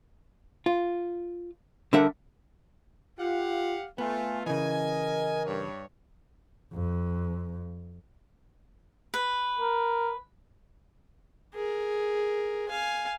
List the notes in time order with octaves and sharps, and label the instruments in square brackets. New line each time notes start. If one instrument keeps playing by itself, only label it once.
[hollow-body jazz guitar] F4
D3 G3 D4 A#4 E5 F#5
[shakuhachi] F4 [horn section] G4 F5 F#5
[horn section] A3 F4 [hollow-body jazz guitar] B3 [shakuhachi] G#5
[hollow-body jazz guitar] C#3 E3 [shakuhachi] A#4 [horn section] D#5 G#5
[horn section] G2 C#5
[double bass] F2
[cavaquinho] B4
[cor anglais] A#4
[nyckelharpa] G#4 A#4
F5 G#5